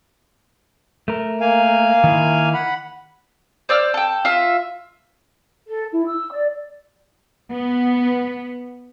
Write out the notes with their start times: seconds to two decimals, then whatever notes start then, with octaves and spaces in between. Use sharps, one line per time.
1.08 A3 A#4
1.41 A#3 F5 G#5
2.04 D#3 E4
2.54 F#5 B5
3.69 C5 D5 E6 F6
3.94 A4 G5
4.25 F4 E5
5.68 A4
5.93 E4
6.07 E6
6.31 D5
7.52 B3